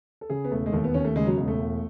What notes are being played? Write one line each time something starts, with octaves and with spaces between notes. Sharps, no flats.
A4
C#3 G#4
B3
E1 A3
G#3
D#2 A3
B3
D#2 C#4
A3
C#3 G#3
F#3
E1 G#3
A3
E1